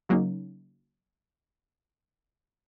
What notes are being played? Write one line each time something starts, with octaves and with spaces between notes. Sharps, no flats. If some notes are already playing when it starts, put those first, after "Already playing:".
C#3 F#3 A#3 C#4 D#4